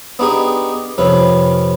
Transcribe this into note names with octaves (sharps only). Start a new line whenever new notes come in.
B3 D4 D#4 G4 G#4
F2 C3 C#4 B4